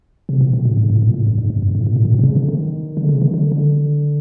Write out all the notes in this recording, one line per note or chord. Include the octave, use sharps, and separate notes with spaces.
C3
B2
B2
A2
G#2
A2
A#2
A2
G2
G#2
G2
G2
A2
A#2
A2
A#2
B2
C3
C#3
D3
D#3
D3
C#3
D#3
D3
D3